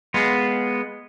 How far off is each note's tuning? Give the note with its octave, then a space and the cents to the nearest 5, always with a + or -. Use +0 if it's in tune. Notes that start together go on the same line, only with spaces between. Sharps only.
G#3 +0 B3 +0 F4 +0